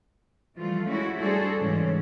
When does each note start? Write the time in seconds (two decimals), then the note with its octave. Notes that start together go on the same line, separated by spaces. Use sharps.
0.57 E3 F3 G3 A3 F4
0.87 G#3 A3 C#4 E4 F#4
1.19 G3 D4 F#4 G#4 A4 C5
1.59 G#2 C#3 E3 G#3 C#4